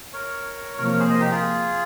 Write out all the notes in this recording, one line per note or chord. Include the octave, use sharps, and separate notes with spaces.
A#4 C#5
C3 F3 A#3 A#4 C#5
A#4 C#5
G#4 C5
C5 D#5
D#4 G4
F4 G#4